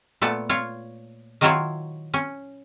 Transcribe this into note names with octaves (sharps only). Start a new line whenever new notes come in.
A#2 A3 B3 A5
F4 C#5
D#3 F#3 E4 F4 C5 C#5
C#4